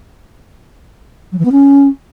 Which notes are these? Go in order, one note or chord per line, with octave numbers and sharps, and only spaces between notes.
F#3
E3
B3
C#4